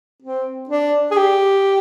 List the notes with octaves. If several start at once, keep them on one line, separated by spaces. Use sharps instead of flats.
C4
D4
G#4
G4